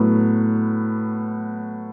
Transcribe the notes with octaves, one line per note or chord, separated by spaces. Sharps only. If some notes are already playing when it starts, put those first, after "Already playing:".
Already playing: A2 F#3 B3